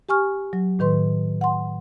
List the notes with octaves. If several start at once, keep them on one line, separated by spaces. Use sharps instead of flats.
G4 G#5 C#6 F6
F#3
A2 D#3 B4 C6
F#5 C6